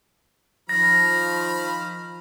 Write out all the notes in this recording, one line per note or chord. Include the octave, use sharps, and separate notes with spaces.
D#3 F3 B5 F6 A#6